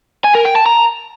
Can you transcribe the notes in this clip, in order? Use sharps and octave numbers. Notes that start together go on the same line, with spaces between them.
G#5
A#4
G5
A5
A#5